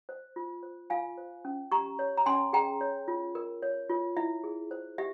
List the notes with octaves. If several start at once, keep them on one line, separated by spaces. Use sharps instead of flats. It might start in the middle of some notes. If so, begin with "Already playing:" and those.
C5
F4
C5
F4 F5 G#5
C5
C#4
G4 A#5 C#6
C#5
A#5
C#4 G#5 C6
G#4 G5 A#5
C#5
F4
A#4
C#5
F4
E4 E5
G#4
C5
G4 E5